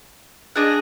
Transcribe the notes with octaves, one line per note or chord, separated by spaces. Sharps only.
D4 G#4 D#5 F#5